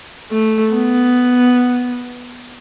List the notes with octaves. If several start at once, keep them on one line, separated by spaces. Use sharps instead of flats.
A3
B3